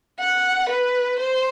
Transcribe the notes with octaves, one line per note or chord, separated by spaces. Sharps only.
F#5
B4
C5